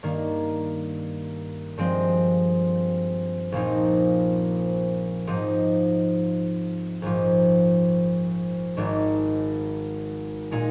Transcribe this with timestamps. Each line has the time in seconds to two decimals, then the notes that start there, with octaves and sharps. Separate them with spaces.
0.03 G2 D#3 A#3
1.77 G2 F3 G#3 C4
3.52 A#1 A#2 F3 C4 D#4
5.27 G#2 F3 C4 D#4
7.02 A#1 G#2 F3
8.77 G#1 G#2 D#3
10.51 A#2 G#3 D#4